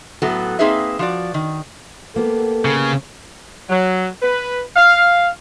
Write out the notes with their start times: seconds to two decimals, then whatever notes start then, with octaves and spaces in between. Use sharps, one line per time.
0.22 A2 F#3 B3 F#4 A4
0.59 A#3 C4 D#4 G#4 B4 E5
0.99 F3 F#4 D5
1.34 D#3
2.16 A#3 B3 G4 A4
2.65 C#3
3.70 F#3
4.23 B4
4.77 F5